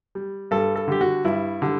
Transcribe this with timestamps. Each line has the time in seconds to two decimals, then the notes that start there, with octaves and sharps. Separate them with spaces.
0.15 G3
0.51 G2 A4
0.76 A4
0.88 D3 G3 G4
1.01 F#4
1.25 G2 E4
1.62 D3 G3